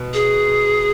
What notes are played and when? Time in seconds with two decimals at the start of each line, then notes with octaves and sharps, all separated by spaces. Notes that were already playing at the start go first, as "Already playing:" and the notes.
Already playing: B2
0.14 G#4